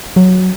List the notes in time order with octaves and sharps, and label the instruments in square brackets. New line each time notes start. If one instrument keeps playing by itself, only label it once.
[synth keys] F#3